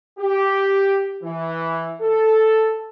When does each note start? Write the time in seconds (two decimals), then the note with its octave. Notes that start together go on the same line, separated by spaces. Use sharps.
0.19 G4
1.23 E3
2.01 A4